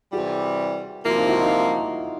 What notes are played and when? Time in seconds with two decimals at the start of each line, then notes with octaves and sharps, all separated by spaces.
0.12 C3 E3 G3 F#4 G#4
1.05 C3 F3 A#3 E4 F#4
1.17 D#4 F4
1.29 E4 F#4
1.40 D#4 F4